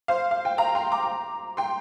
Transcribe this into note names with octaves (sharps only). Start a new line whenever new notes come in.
C5 F5
F5
G5
F5 A#5
G5 C6
A#5 D6
G5 C6